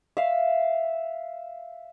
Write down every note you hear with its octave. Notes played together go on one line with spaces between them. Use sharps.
E5 F5